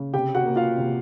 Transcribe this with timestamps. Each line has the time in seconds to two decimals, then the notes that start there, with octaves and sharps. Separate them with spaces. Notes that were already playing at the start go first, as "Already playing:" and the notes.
Already playing: C#3
0.14 C3 G4 G5
0.35 F#4 F#5
0.46 A#3
0.56 F4 F5
0.78 C3